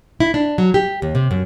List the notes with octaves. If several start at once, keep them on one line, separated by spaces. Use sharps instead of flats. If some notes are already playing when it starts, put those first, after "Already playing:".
E4
D4
F#3
G4
D#2
C3
F#2